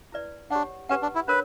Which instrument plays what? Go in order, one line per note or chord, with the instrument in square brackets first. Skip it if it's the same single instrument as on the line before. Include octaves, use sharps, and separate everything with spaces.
[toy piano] E4 B4 D5
[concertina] D4 [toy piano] G4 C#5 F#5
[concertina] C#4 [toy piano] G4 B4 F#5
[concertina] D4
E4
[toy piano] D4 A#4 C#5 [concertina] B4